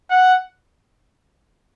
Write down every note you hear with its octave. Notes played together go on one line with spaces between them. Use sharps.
F#5